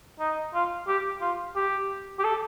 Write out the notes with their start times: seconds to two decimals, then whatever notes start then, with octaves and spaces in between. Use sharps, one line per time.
0.20 D#4
0.54 F4
0.88 G4
1.21 F4
1.56 G4
2.19 G4
2.24 A4